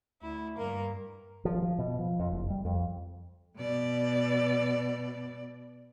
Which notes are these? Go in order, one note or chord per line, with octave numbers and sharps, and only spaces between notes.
D2 E4
G2 A#3 A#4
F3
F3
B2
F3
F2
F#1
G3
F2
B2 D5